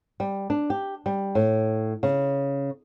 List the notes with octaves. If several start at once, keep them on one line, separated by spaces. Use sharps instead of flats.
G3
D4
G4
G3
A2
C#3